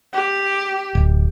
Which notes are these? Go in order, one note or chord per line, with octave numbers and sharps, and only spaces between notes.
G4
D1